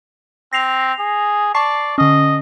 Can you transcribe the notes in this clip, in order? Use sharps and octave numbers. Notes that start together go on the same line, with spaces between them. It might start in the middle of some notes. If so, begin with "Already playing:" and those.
C4 A#6 C7 F7
G#4
D5 A5 C#6 C7
D3 C#4 D#5